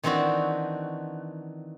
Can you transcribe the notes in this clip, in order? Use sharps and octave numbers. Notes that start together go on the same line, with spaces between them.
D#3 E3 C4 D4 F#4